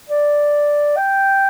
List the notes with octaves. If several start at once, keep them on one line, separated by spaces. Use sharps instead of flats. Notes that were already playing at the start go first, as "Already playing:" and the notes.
D5
G5